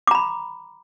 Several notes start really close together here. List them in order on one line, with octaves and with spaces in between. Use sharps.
D6 A#5 B5